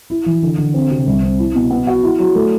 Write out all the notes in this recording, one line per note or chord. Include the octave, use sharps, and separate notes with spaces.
E4
E3
D3
D3
C4
C3
C2
C4
E4
B2
B3
F#4
E4
F#3
A3